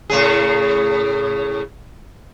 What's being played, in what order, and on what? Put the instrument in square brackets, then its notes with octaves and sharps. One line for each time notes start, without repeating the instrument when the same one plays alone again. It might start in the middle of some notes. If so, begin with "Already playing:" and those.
[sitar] A2 C#3 G#4